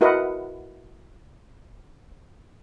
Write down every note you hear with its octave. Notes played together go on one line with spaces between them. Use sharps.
E4 F#4 A#4 B4 D#5 F#5